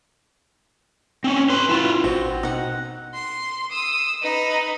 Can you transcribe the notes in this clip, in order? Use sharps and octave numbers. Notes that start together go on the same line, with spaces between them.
C4 C#4
B4 C6
E4 F4
A1 C4 F#4
B2 D#4 F#5
C6
D#6 E6
D#4 B4